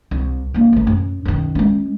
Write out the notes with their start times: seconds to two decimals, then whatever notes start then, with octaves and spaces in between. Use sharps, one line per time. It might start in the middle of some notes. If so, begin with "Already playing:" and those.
0.11 C2
0.54 D3 A#3
0.73 A1 A3
0.87 F#2
1.25 F#2 D#3
1.55 G#3 C#4